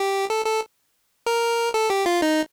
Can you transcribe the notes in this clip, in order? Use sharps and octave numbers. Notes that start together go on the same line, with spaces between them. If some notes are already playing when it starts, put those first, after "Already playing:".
Already playing: G4
A4
A4
A#4
A4
G4
F4
D#4